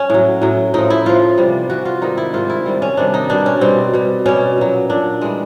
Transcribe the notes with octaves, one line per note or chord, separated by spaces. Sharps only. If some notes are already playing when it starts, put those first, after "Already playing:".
Already playing: C#4
A2 F#3
A2 F#3
A2 F3 D#4
E4
A2 F3 F4
C3 E3 G3
C3 E3 G3 F#4
F4
G#2 D#3 G3 D#4
E4
G#2 D#3 G3 F4
E4
C3 D#3 G3
C#4
C3 D#3 G3 D4
D#4
B2 G3 D4
C#4
B2 G3 C4
B2 G3
B2 G3 C#4
A#2 F#3
A#2 F#3 D4
E3 G3 G#3